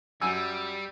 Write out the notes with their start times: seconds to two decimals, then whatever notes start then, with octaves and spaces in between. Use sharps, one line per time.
0.21 F#2 G3 G#5 E6